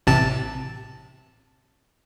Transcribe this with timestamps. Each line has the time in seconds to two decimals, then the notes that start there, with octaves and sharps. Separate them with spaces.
0.07 A1 C3 A5